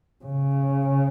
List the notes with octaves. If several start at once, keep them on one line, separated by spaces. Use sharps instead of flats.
C#3